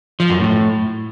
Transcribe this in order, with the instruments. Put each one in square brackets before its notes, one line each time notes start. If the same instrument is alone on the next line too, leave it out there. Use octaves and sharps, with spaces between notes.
[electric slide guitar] F3
F#2
A2